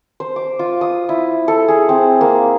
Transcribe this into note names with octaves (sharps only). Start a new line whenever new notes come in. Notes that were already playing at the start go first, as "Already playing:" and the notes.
C5
D6
F4
D#6
E4
A4
G#4
C4
A#3